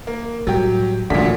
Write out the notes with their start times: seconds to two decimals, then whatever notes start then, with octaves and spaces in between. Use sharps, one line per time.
0.07 A#3
0.47 A2 F#3 G3 G4
1.10 A1 F#2 A#2 D3 G3 B6